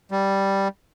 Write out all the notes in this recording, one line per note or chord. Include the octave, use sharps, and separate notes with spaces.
G3